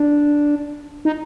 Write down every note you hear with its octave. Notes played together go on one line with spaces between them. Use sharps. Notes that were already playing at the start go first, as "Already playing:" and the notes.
Already playing: D4
D#4